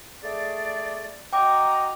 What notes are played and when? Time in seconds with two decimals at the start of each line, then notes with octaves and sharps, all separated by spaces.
0.23 A3 G#4 D5
1.33 F#4 D#5 G5 A#5 D6